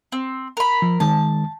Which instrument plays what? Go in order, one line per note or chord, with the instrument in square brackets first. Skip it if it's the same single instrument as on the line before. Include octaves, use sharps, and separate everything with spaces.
[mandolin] C4
A#4 B5
[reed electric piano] F3
[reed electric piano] D#3 G#3 [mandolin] A5